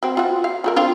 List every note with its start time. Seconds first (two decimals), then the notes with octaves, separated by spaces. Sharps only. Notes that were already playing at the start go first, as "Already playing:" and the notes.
0.03 C4 F#4
0.17 F4 F#4
0.44 F5
0.64 F4 F#4 A#4
0.76 C4 D4 F4